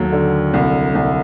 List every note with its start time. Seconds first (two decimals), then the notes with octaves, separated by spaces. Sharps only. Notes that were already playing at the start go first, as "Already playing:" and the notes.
Already playing: D#2 F#3 A3
0.12 D3
0.54 C2
0.95 C2